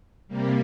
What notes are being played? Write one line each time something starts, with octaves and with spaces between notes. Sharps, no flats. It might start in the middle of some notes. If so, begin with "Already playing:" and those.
C3 G3 A#3